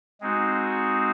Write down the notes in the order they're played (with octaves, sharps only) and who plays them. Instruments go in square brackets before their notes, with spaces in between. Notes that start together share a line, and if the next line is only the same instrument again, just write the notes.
[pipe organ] G#3 C4 D#4 F#4